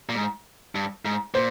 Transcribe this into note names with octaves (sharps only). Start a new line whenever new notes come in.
A#2
G#2
G2
G#2
A#2 C5